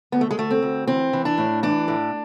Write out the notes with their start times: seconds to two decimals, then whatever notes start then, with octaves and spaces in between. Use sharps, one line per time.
0.12 D2 B3
0.21 A3
0.31 G#3
0.38 D2 A3
0.51 C4
0.62 D2
0.87 E3 C4
1.13 E3
1.25 D4
1.38 A2
1.63 E3 D4
1.88 A2